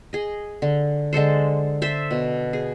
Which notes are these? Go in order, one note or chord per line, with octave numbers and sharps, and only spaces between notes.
G#4 D#5
D3
D3 G#3 A4 C5
A4 C5 E5
B2
G#4